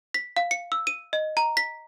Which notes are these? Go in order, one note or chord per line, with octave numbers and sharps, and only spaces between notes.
B6
F5
C#7
E6
D#7
D#5
A#5
B6